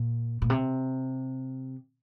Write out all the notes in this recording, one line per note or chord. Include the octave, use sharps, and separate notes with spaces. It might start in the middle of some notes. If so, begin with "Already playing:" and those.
Already playing: A#2
A#2
C3